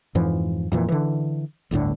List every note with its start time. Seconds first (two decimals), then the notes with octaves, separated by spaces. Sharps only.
0.15 F2 G#2 E3 F3
0.72 F2 A#2 E3
0.89 D3 E3
1.71 G1 D2 A2 D3